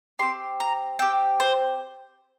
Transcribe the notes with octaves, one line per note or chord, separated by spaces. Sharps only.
C4 G4 C6
A#5
C4 G4 G5
C5